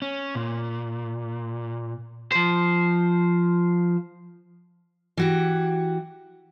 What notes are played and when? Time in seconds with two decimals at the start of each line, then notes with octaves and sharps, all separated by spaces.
0.02 C#4
0.35 A#2
2.32 F3 C5
5.17 E3 F#4 G4